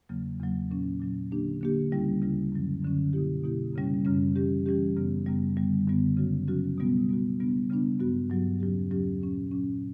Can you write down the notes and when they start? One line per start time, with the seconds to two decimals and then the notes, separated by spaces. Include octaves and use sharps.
0.09 E2 C#3 F#3 A#3
0.40 E2 C#3 F#3 A#3
0.71 A#2 F#3 C#4
1.00 A#2 F#3 C#4
1.32 D3 A#3 D4 G4
1.61 D3 A#3 D4 G4
1.92 D2 C#3 G3 C#4 E4
2.22 D2 C#3 G3 C#4 E4
2.52 F#2 D3 F#3 C#4
2.83 F#2 D3 F#3 C#4
3.13 B2 A#3 E4 G4
3.44 B2 A#3 E4 G4
3.74 F#2 C#3 G3 C#4
4.05 F#2 C#3 G3 C#4
4.36 E3 G3 C#4 G4
4.66 E3 G3 C#4 G4
4.97 F#2 C#3 G3 B3
5.27 F#2 C#3 G3 B3
5.57 F#2 D3 G3 B3
5.87 F#2 D3 G3 B3
6.17 C#3 F#3 C#4 F#4
6.48 C#3 F#3 C#4 F#4
6.78 B2 G3 B3 F#4
7.09 B2 G3 B3 F#4
7.40 C#3 G3 B3 D4
7.70 C#3 G3 B3 D4
7.99 G2 F#3 B3 F#4
8.30 G2 F#3 B3 F#4
8.60 E2 C#3 F#3 C#4 G4
8.91 E2 C#3 F#3 C#4 G4
9.22 A#2 F#3 C#4
9.51 A#2 F#3 C#4